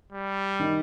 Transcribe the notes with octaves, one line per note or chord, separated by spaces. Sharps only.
G3
D#3 D#4